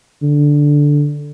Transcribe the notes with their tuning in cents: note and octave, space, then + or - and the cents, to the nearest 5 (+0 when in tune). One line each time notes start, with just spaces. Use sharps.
D3 -5